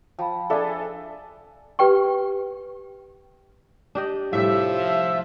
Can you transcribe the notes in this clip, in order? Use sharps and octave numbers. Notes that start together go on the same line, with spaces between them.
F3 G5 A5 B5
D4 G#4 A4 D5 E5
G4 B4 G5 C#6
D4 G4 D#5
A2 C3 F3 G3 E5